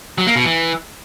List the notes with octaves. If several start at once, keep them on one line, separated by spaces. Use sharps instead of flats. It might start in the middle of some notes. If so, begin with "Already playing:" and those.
F#3
A#3
B2
E3